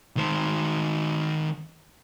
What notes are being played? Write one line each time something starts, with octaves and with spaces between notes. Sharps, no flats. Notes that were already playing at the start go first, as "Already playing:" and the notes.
D#3 C5